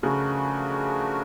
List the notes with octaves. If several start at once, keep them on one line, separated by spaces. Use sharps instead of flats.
C#3 F3 A3 D4 F#4 A#4